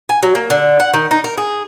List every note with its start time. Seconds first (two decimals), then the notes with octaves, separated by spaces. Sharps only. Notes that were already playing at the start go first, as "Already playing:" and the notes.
0.09 G#5
0.23 F#3
0.35 A#3
0.50 D3
0.80 F#5
0.94 D#3
1.11 D#4
1.24 A#4
1.38 G#4